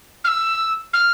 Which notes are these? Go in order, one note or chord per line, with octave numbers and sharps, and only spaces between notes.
F6
E6
F6